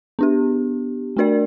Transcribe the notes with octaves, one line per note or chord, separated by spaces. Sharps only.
B3 D4 G4
A3 D4 F#4 A#4 D5